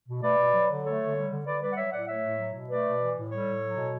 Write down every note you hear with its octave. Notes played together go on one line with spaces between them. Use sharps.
B2
A3 B4 D5
B2
F#3
D3
A3 A4 C#5
D3
G3
D3
D3 B4 D5
G3 B4 D5
F#5
F#3 C#5 E5
A2 D5 F#5
A3 C#5 E5
A2
F#3
B2
A3 B4 D5
B2
E3
A2
G3 A4 C#5
A2
F#3
B2